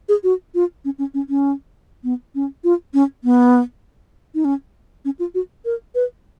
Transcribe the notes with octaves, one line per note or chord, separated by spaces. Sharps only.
G#4
F#4
F4
C#4
C#4
C#4
C#4
B3
C#4
F4
C#4
B3
D#4
C#4
C#4
F4
F#4
A#4
B4